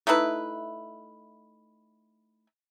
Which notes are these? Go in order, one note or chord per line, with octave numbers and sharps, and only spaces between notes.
A3 D#4 E4 B4